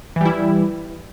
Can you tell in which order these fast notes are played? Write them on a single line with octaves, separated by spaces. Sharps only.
E3 G3 E4